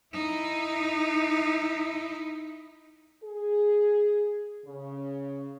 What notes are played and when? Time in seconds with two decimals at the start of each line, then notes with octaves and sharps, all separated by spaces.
0.13 D#4 E4
3.23 G#4
4.66 C#3